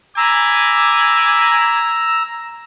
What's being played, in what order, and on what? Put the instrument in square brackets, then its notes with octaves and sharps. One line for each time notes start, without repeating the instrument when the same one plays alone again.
[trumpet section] G#5 B5 D6 [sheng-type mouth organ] A#5 E6